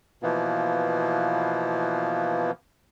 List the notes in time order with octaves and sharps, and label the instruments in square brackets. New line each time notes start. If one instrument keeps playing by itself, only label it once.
[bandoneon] B2 E3 F3 A#3 B3